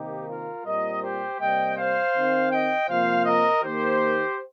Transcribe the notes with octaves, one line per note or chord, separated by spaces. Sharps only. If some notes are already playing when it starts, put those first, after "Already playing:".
Already playing: C3 D#3 A#3 D#4 G4
F4 A#4
A#2 G3 C4 A#4 D#5
G4 C5
C3 G3 A#3 D#5 G5
C5 F5
D#3 C4
D#5 G5
C3 F3 A#3 C5 F5
A#4 D#5
D#3 A#3 G4 C5